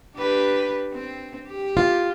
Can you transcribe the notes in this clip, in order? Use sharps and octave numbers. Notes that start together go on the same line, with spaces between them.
D4 G4 B4
C4
G4
F4